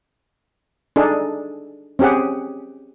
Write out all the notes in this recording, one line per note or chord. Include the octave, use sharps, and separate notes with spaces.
D4 D#4 G#4 A4
C4 C#4 G4 G#4 F#5